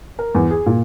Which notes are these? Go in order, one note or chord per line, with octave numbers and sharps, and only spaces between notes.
A#4
E2
G#4
A#2